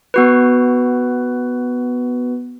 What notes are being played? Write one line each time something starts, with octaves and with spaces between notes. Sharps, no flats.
B3 F#4 B4